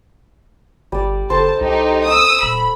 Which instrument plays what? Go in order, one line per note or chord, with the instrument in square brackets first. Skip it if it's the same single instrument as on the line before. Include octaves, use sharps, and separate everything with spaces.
[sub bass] G1 [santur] G3 D5
[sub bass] F#1 [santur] A4 C5 [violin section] A5
[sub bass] C2 [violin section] D#4 G4
[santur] C#6 [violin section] D#6 E6
[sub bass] D#1 [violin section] B5